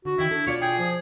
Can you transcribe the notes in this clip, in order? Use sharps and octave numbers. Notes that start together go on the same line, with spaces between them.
D3 F#4
D3 D#3 E4 G5
D4 A4
B2 F4 C#5 D5
G#4 G5
F3